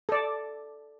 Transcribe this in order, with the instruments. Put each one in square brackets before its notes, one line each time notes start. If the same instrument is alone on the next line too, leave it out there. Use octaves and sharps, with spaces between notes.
[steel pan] A4 D5